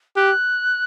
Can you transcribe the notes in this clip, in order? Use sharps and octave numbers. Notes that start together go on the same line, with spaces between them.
G4 F#6